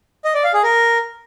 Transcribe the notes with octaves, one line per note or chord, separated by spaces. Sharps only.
D#5
D5
F5
G#4
A#4